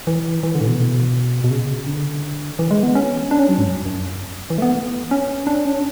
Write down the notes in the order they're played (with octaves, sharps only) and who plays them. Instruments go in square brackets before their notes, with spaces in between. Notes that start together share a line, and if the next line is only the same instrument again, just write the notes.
[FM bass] E3
E3
D3
A2
B2
B2
C#3
D3
E3
G#3
B3
C#4
D4
C#4
F#3
G#2
F#2
F#2
E3
A3
B3
C#4
D4
C#4